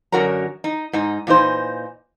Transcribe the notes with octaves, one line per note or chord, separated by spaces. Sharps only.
F#2 D3 F#4 A#4 C#5 A#5
D#4
G#2 D#4
A#2 E3 D#4 C5